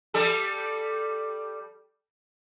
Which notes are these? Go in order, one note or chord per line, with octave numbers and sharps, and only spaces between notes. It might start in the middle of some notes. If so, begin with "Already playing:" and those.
G3 A4